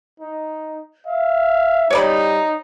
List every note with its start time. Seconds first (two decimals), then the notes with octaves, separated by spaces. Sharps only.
0.20 D#4
1.07 E5 F5
1.90 G3 D#4 C#5 D5 B5